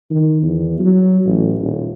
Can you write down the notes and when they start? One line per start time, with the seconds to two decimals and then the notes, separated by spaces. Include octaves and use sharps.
0.11 D#3
0.42 E2
0.79 F#3
1.26 A1
1.59 D#1